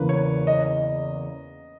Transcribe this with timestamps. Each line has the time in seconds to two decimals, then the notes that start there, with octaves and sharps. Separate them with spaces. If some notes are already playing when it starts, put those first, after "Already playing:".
Already playing: E2 C#3 E3 A#3 B4
0.09 C#5
0.47 D#5